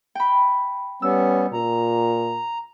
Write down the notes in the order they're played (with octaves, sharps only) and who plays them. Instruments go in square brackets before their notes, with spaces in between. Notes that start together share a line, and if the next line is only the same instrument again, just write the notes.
[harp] G5 B5
[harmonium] G3 B3 C#4 [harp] E6
[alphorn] A#2 [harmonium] A#5